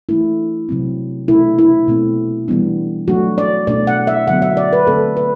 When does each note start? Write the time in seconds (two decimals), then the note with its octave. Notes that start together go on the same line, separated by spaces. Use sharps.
0.09 E3 A3 D4 E4
0.69 C3 F#3 C4
1.28 B2 A3 D4 E4
1.59 E4
1.88 B2 A3 C4
2.48 E3 G3 B3 D4
3.08 F#3 A3 D4 F#4
3.38 D5
3.67 B2 A3 D4 D5
3.87 F#5
4.07 E5
4.27 D3 F#3 B3 F#5
4.42 E5
4.57 D5
4.73 B4
4.87 D3 A3 C4 A4
5.17 B4